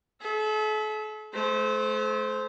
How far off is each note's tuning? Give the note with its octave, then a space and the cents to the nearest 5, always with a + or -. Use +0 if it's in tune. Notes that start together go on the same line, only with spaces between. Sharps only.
A4 -45 E5 +0
A3 -35 C5 -10